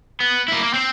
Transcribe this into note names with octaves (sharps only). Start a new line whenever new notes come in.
B3
A#3 E4
A#3
C4 C5